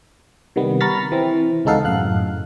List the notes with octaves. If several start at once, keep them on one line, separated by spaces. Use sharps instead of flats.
C3 D#3 G3 B3
A#5 B5 C#6 F6 A6 B6
E3 C4
C#2 G#3 D#4 A4 F5 F#5
F#2 A2 F5 F#6